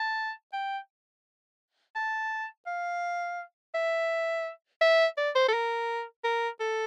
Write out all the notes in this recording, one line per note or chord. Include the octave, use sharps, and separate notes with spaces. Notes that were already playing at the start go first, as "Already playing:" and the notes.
Already playing: A5
G5
A5
F5
E5
E5
D5
C5
A4
A#4
A#4
A4